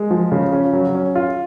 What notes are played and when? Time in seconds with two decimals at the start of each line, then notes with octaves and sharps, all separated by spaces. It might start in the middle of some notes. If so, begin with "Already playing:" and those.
Already playing: G#3
0.11 F3
0.32 C#3
0.52 C#4
0.73 F#3
0.95 C#4
1.15 F4